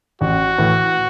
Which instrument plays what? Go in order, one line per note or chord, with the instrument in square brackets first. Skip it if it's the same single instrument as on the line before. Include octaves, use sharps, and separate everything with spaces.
[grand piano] A1 [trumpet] F#4
[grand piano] A2 E3